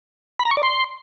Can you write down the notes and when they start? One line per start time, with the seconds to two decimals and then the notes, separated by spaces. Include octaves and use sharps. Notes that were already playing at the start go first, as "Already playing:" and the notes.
0.39 B5
0.45 A#5
0.51 C#6
0.57 D5
0.63 C6